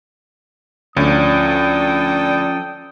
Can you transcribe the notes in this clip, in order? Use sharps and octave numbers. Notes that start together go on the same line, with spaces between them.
D2 F3 C#4 A4 D5 G5 D#6